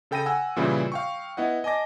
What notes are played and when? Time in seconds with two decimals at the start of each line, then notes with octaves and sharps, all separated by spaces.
0.11 C#3 A4 G5 B5 A#6 D#7
0.26 F#5 G#5 E6
0.56 A#2 C#3 E3 G3 E4 F4
0.92 F5 G5 C#6
1.37 B3 E4 D#5 F#5
1.64 D#5 G#5 A5 D6 A#6